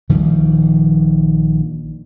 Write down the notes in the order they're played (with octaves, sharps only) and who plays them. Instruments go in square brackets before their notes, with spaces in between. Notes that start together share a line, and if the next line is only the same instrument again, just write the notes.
[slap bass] A#1 D#3 F3 G3